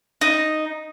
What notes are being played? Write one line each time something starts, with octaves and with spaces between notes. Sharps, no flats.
D#4